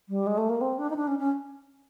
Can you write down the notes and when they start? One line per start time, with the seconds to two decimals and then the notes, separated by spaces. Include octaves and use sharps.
0.09 G3
0.27 G#3
0.38 A3
0.50 A#3
0.61 C4
0.78 D4
0.90 D#4
0.96 D4
1.08 C#4
1.19 C#4